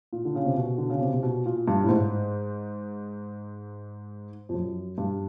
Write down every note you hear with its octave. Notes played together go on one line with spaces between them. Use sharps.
A#2
D3
C#3
C3
B2
D3
C#3
C3
C3
B2
A#2
G2
A2
G#2
F2
F#2
G2